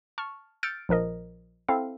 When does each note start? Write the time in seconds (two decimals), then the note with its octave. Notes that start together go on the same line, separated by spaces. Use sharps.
0.18 A5 C#6 F6
0.63 E6 F6 G6 A6 C#7 D7
0.89 A#1 F3 A#4 D#5
1.68 C4 E4 A4 F5